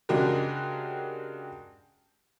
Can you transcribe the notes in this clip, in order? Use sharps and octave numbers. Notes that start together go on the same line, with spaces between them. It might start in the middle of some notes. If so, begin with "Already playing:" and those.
C#3 G#3 D4 F#4 G4 A#4